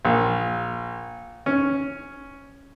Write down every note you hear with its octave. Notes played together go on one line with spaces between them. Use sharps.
A#1
C#4